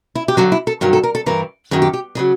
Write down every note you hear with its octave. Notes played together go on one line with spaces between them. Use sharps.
E4
G4
G2 D3 F#3 F#4
E4
A4
G2 D#3 F#3 A#4
A4
A#4
A4
G2 E3 A#4
F#2 D#3 F#3 G#4
G4
G4
C#3 F#3 G#4